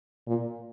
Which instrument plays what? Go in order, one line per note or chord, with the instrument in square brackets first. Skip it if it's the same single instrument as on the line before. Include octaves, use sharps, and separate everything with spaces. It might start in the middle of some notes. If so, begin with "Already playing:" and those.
[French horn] A#2